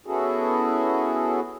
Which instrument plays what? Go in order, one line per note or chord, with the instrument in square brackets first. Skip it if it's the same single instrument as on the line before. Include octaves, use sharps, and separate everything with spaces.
[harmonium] B3 C#4 E4 F#4 G#4 A4